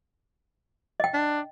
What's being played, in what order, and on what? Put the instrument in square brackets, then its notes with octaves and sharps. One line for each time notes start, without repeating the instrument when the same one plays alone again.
[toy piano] D#5 G5
[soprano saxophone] D4